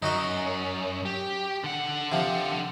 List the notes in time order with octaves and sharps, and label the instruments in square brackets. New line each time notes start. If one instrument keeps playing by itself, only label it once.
[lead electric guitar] F#2 [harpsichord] D#4 F#4 D#5
[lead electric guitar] G4
D3 F#5
[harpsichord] C3 F3